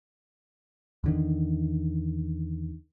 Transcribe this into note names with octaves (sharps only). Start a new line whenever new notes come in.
E2 D3 D#3